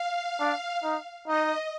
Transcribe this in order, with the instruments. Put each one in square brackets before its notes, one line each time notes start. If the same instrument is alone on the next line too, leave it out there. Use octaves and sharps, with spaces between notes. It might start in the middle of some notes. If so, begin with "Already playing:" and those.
Already playing: [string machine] F5
[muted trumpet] D4
D#4
[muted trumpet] D#4 [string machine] D#5